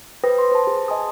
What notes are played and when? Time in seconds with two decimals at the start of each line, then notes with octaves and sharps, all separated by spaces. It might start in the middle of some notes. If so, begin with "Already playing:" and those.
0.24 B4 C5 G5 D#6 A#6
0.38 C6
0.52 C5 A5
0.67 G#4
0.88 D#5 G#5 A5 C6 D#6